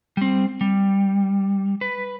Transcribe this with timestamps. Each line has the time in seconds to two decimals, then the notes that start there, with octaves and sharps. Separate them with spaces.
0.17 G3 C4
0.61 G3
1.81 B4